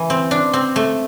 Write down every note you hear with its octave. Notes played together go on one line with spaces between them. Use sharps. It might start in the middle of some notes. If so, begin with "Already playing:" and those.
Already playing: E3
C4
D4
C4
A3